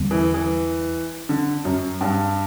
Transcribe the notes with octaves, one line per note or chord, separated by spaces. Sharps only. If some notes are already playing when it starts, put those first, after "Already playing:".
Already playing: E2 D3 G3 C4
E3
E3
D3
F#2
G2